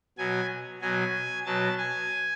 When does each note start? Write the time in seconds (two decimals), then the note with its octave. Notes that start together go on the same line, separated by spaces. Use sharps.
0.18 B2 F#3 G#5
0.82 B2 F#3 G#5
1.46 B2 F#3 A5
1.78 G#5